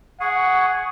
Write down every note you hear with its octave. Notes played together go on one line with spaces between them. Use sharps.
G#4 F#5 C#6